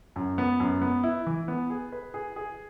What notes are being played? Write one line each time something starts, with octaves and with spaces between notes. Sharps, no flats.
F#2
B3
F#2
B3
E4
E3
B3
G#4
B4
G#4
G#4